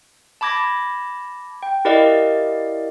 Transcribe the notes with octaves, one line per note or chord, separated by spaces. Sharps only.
A5 B5 D6 G#6 A#6
G5
E4 G4 A#4 D5 D#5 F5